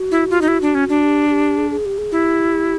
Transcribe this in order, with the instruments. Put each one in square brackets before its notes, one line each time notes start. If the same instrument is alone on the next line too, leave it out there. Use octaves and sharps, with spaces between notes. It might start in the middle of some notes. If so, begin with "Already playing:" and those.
Already playing: [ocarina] F#4
[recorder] E4
F4
D#4
E4
D4
C#4
D4
[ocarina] G4
G4
G#4
G#4
G4
G#4
[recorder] E4 [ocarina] G4